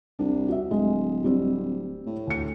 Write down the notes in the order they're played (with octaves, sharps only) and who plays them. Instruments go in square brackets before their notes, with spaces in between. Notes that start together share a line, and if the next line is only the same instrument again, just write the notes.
[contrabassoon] C2 [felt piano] D4
[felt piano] F#4 E5
[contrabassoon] D1 [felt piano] G#3
[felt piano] G3 C4
[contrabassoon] A2
[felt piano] D2 C#7